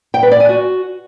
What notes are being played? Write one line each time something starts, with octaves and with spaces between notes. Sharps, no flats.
G5
B4
D5
G#5
F#4